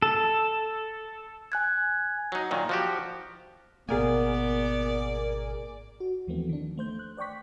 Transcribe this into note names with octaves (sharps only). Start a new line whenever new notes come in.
A4
G#5 F#6 G#6
F#3 D#4
A#2 D#3 F#3
F3 F#4 G4
G#1 B2 A#3 B3 G#4 A#4 D5 G#5
F#4
D#2 E3 F3 A3 B3 C4
D#3 D4
A3 C5 G6
F#6
C5 D5 G5 C#6 B6